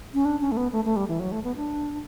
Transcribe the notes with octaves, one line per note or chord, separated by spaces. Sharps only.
C#4
D4
C#4
A3
B3
A3
A3
G3
E3
F#3
A3
B3
D4